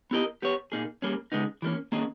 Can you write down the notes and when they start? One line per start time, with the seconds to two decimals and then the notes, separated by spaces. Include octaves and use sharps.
0.11 B3 E4 G4 A#4 D#5
0.42 B3 G4 C#5
0.72 A#2 A#3 D#4 G#4
1.02 G3 A#3 C#4 G#4
1.32 C#3 G#3 B3 D#4
1.62 E3 G3 A#3 C#4
1.92 D#3 A#3 C#4 G#4 D#5